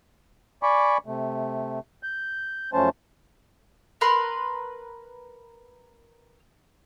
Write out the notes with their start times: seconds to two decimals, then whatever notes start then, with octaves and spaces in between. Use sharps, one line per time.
0.63 D5 G#5 B5 C#6 D6
1.06 C3 A3
2.03 G6
2.73 F#2 F3 A3 C#4 C5 A5
4.01 A#4 B4 C6